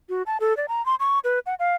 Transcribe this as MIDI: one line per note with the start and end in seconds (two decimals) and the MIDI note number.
0.09 0.23 66
0.26 0.37 81
0.40 0.56 69
0.57 0.66 74
0.68 0.84 82
0.86 0.95 84
1.00 1.19 85
1.24 1.39 71
1.46 1.55 78
1.59 1.76 77